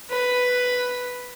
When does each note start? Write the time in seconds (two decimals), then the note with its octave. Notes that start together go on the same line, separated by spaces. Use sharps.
0.11 B4